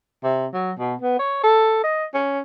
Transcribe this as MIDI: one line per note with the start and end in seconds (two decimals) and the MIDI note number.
0.24 0.47 48
0.54 0.72 54
0.79 0.95 47
1.01 1.15 59
1.19 1.41 73
1.43 1.81 69
1.84 2.05 75
2.14 2.41 61